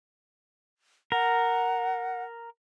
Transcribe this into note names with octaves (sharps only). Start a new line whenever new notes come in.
A#4 F#5